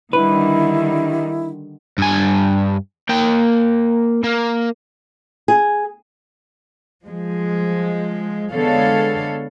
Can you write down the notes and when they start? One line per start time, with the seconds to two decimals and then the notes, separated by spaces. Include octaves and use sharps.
0.13 D3 D#3 G3 E4 B4
1.98 G2 G#5
3.09 A#3 G5
4.24 A#3
5.48 G#4
7.04 F3 G#3
8.50 D3 G#3 B3 A4 C#5 F5